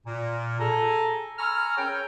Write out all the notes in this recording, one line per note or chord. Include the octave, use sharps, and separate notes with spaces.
A#2
G#4 A4 A#5
G#5 A#5 B5 C#6 E6 F6
C#4 G#4 A#4 C#5 G5